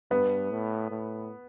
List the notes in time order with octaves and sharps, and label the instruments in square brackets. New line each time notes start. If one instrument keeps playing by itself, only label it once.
[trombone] G2 [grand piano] B3
[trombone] A2
A2